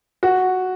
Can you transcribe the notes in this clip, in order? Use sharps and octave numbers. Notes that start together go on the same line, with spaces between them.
F#4